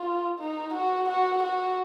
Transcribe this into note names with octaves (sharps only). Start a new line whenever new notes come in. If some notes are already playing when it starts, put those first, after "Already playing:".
Already playing: F4
D#4
F#4
F#4
F#4